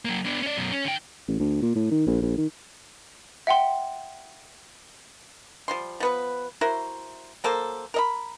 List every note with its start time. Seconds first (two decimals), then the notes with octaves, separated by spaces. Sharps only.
0.05 F#3 A#3
0.25 B3 D4
0.42 C#4 D5
0.57 F#2 B2
0.72 C#4
0.85 D3 G5
1.28 A1
1.39 D2
1.62 A#2
1.75 A2
1.91 D#3
2.07 A#1
2.22 A#1
2.37 D#3
3.47 E5 F#5 G5 C6
5.68 F3 G3 C6
6.00 F3 B3 B4
6.61 E4 F#4 A#4 C5
7.44 F#3 A#3 A4 C5
7.94 A#4 D#5 B5